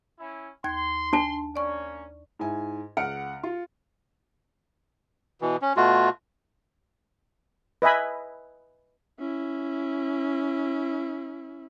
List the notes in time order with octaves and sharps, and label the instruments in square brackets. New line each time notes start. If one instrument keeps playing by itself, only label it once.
[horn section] C#4 E4
[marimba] D#2 G#6 [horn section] C6
[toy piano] D4 A5
[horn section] A#3 C#4 [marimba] D5 C#6
[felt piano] G#2 E4 G#5
C#2 F#5 F6 C#7 D7
F4
[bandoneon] B2 E3
C#4
B2 A3 F4 F#4
[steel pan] B4 D#5 E5 G#5 B5
[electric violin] C#4 E4